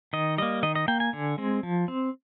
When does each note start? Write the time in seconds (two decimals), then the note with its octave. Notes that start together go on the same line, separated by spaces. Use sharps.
0.13 D#3 D#5
0.38 G3 A#3 D#5
0.63 D#3 D#5
0.75 D#5
0.88 A#3 G5
1.00 G#5
1.13 D3
1.38 G#3 C4
1.63 F3
1.88 C4